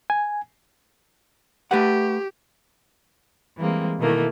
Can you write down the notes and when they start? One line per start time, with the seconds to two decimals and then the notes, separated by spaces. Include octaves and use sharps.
0.10 G#5
1.71 A3 G4 B4 F#5
3.56 E3 G3 G#3 A#3 C4
3.98 B2 D#3 E3 A3 A#3